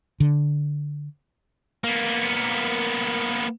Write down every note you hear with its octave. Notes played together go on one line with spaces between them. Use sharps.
D3
A#3 B3